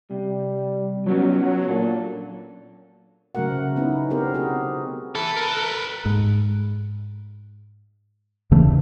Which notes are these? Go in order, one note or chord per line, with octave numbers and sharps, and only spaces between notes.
C3 G3
F3 F#3 B3 C#4 D#4
A#2 D4 A4
C#3 F#3 A3 F#4 A#4 F#5
C5
B3 C#4 D#4 E4 B4
B3 C4 G4 A#4 C5
B3 C4 F#4 G#4 A4
A4 B4 E5
A#4 B4
G#2
D#2 C#3 E3 A3